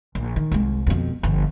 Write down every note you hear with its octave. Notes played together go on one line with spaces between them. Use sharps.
A#1
D#3
C2 G#3
F2 B2
G1 F3